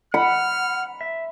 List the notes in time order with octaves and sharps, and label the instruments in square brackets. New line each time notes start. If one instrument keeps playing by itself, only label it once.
[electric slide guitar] F#5 [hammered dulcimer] B5 [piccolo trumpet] F6
[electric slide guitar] E5